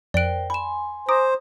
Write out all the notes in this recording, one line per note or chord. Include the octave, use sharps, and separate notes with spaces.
F2 A#4 C5 D5 G5 F#6 D7
G#5 B5 C6 E7
C5 A#5 D6 D#6 A#6